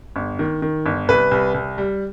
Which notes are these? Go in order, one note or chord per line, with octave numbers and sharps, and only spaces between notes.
G1
D#3
D#3
G1
C2 B4
C2
C2
G3